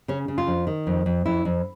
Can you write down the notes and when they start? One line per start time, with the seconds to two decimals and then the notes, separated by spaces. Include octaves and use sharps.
0.08 C#3 C#4
0.28 C#3
0.38 F4
0.47 F2
0.67 D#3
0.87 F2
1.06 F2
1.26 F2 E4
1.45 F2